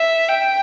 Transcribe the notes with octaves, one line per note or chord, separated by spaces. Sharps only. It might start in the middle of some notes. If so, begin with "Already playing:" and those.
Already playing: E5
G5